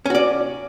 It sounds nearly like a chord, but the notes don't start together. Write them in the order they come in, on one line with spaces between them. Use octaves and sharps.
C#4 F#4 D5